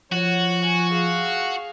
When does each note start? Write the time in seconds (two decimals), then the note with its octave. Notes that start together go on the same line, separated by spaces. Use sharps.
0.12 F3 F#4 C#5 F#5
0.61 F#5 G#5
0.92 G#4 F5